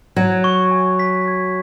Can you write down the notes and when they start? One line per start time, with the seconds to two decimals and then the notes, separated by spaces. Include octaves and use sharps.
0.16 F#3 G#6
0.44 C#6
0.71 G#5
0.99 B6
1.28 G#6